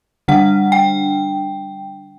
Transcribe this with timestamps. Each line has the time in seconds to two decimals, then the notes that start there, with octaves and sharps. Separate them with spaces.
0.28 D3 G3 D4 F#5
0.72 G5